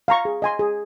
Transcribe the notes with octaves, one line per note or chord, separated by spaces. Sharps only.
F5 A#5 C#6
G#4
D#5 G#5 C6
G#4